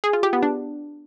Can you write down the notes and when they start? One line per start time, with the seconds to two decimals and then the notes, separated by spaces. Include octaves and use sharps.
0.04 G#4
0.13 F4
0.23 G4
0.33 B3
0.43 D4